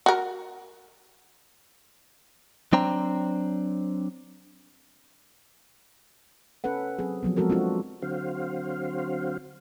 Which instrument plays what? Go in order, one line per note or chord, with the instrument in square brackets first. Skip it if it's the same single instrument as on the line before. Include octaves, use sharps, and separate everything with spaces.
[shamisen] F#4 A#4
[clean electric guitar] F#3 C4 D4 C5 G5 A#5
[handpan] C#4 A4 B4 F#5
F#3 C4 G#4
F3 F#3 B3
F3 G#3 C4 F#4 A4 A#4
C4 D4 F4 F#4
[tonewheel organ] D3 F#3 C4 F#4 C5 F5